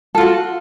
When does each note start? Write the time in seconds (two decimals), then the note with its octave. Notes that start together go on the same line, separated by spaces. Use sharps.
0.15 A4
0.18 F4
0.21 F#4